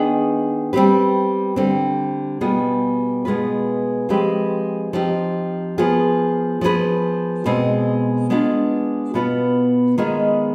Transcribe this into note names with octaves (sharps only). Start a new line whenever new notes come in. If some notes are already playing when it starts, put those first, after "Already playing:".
Already playing: D#3 B3 D4 G#4
G3 C4 G4 B4
D3 G3 C4
B2 G3 B3 F4 G#4
B2 G#3 B3 F4 B4
F3 G#3 C4 G4 B4
F3 C4 D#4 G4
F3 B3 F4 G#4
F3 B3 D4 G#4 B4
B2 G#3 C4
G#3 B3 D4 F4
B2 B3 F4 B4
D#3 G#3 B3 F4 G#4